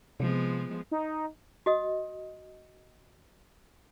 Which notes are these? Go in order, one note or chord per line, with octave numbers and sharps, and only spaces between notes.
C3 F3 G#3 B3
D#4
F#4 D#5 D#6